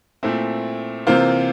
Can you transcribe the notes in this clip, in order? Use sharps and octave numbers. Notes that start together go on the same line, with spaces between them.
A#2 A3 C4 E4
C3 E3 A#3 F4 C5